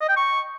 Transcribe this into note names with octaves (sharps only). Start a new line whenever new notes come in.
D#5
G5
C#6